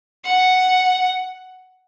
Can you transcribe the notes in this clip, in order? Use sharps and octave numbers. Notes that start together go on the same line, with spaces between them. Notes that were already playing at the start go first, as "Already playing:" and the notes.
F#5